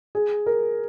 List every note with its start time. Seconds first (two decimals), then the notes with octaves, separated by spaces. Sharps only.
0.15 G#4
0.46 A#4